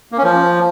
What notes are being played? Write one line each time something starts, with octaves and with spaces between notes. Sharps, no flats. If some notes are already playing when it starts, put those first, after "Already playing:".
A#3
C#4
F3